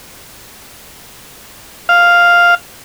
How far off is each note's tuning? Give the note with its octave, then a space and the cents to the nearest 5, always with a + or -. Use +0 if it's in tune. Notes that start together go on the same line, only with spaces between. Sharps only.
F5 +0